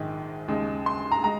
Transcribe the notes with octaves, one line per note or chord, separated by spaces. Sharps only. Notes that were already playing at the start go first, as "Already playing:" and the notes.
Already playing: A#1 G#2 D#3 G#3
D#2 C#3 G#3
C6
A#5
G#3 A#5